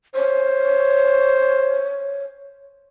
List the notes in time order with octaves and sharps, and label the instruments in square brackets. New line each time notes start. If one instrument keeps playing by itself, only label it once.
[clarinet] C5 [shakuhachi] C#5